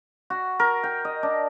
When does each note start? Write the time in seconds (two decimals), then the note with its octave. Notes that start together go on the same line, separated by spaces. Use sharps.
0.30 F#4
0.60 A#4
0.84 G5
1.05 D#5
1.23 D4